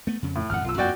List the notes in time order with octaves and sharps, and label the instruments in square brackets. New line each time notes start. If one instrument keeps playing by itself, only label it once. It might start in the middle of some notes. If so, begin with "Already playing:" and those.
[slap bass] A3 B3
F2 C#3
[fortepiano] A2
[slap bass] G#1 F2 A2 [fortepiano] F#5 F6
[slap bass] B1 [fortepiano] F4 E6
[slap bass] F2 A#3 [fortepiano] F#4 D5 G5